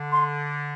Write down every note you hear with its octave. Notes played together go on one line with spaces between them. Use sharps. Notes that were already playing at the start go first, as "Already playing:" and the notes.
Already playing: D3
C6